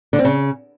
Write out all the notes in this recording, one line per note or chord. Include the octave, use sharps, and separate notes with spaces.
D3
C4
C#3